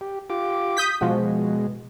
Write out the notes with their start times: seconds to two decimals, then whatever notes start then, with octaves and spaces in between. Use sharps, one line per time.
0.01 G4
0.30 F4 G4 D6
0.77 D#6 G6 B6
1.01 B2 F3 G#3 F#4